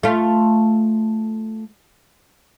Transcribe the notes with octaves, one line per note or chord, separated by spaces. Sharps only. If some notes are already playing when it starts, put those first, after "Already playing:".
A3 F4